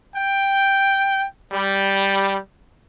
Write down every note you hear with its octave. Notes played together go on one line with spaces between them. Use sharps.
G5
G3